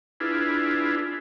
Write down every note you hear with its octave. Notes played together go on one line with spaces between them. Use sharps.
D4 E4 F4 G#4 B4